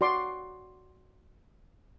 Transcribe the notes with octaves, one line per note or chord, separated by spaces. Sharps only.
F#4 D5 C6 D6